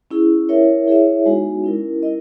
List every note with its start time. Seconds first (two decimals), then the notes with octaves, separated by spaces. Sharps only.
0.11 C#4 E4 G#4
0.49 E4 A#4 C#5 E5
0.87 E4 G#4 C#5 E5
1.26 G#3 B3 D#4 F#4
1.64 C#4 E4 A#4
2.03 E4 A#4 D#5